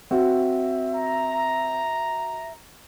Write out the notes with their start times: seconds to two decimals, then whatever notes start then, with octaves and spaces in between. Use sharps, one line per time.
0.11 C4 F#4 E5
0.96 A#5